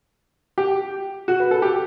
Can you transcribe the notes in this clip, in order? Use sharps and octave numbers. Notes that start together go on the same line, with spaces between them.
G4
F#4
B4
A4
G4